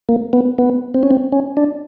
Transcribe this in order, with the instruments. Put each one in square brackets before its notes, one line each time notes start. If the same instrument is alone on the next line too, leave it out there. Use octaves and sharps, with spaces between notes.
[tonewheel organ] A#3
B3
B3
C4
C#4
C4
C#4
D4